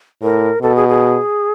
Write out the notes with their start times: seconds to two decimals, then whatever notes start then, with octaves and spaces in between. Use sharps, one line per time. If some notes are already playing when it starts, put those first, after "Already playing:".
0.22 A2 A#4
0.62 B2 A4
0.76 G#4
0.89 G#4